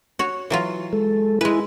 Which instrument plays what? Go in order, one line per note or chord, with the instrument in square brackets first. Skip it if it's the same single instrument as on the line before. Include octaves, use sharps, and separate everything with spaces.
[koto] F#4 C#5
E3 F#3 F4
[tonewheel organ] G#3 A4
[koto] G#3 B4 [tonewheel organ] E4 G#5